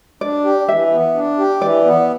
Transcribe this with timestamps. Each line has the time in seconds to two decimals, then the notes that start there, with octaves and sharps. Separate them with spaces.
0.21 D4 D5
0.44 G4
0.69 E3 E5
0.92 B3
1.15 D4
1.38 G4
1.61 E3 D5
1.84 B3